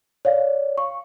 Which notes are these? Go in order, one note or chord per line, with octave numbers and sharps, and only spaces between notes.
C#5 D5 F5
C#6